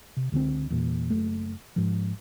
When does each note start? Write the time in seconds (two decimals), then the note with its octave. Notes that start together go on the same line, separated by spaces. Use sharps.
0.17 C3
0.32 C#2 D3 D#3 C4
0.70 E2 A#2
1.10 F#1 A3
1.76 G#2 F3